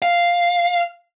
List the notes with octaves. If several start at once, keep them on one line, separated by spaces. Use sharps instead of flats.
F5